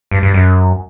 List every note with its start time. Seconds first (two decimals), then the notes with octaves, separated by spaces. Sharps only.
0.11 G2
0.23 G2
0.34 F#2